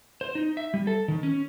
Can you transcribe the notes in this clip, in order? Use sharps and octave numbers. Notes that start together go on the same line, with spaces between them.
C5
D#4
E5
G3
A4
D#3
C#4